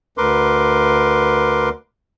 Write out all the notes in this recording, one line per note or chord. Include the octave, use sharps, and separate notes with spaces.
D2 A#4 B4 C6 D6